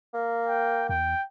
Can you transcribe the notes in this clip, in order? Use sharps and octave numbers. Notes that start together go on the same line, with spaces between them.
A#3
G5
E2 G5